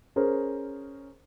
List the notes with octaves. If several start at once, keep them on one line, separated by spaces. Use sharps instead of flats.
C#4 G#4 A#4 C5